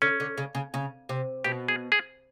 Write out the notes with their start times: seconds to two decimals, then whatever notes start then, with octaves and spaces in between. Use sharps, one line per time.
0.02 D3 C#4
0.20 D3
0.38 C#3
0.55 C#3
0.74 C#3
1.09 C3
1.44 B2 G4
1.68 G#4
1.92 G#4